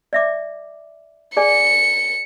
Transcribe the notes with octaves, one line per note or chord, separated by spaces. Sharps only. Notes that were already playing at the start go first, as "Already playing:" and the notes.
D5 E5 D6
G#4 D5 G#5 C#7